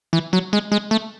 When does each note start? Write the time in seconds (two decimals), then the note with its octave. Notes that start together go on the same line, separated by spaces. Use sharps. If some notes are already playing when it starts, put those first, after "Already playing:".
0.13 E3
0.33 F#3
0.53 G#3
0.72 G#3
0.91 A3